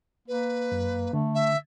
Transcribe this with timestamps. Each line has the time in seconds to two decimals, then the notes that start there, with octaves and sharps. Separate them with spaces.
0.28 A#3 B4
0.72 F#2
1.13 D3 A3
1.34 E5